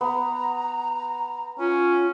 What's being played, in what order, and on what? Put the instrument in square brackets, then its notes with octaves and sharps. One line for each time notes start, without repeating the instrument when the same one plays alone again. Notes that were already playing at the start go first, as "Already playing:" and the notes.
[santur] B3 [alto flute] A#5
[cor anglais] C#4 [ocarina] F4